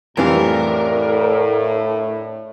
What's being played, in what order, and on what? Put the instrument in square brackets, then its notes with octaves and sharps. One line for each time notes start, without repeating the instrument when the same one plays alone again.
[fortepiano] F2 E3 G3 [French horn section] A2 [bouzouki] D4 F5 [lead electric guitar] A#4